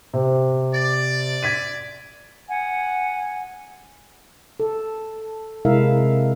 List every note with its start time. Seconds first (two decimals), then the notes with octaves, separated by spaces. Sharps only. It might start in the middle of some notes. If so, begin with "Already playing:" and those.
0.14 C3
0.75 D5
1.43 G#6 B6 D#7
2.48 F#5 G#5
4.60 A4
5.65 C3 G#3 E4 A#4 E5 F5